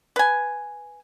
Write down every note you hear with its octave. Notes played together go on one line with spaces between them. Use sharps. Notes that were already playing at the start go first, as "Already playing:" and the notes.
B4 G#5